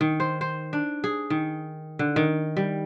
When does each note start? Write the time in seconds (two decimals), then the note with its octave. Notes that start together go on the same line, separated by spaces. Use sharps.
0.01 D#3
0.20 C5
0.41 C5
0.73 D4
1.04 G#4
1.30 D#3
1.99 D3
2.16 D#3
2.57 G3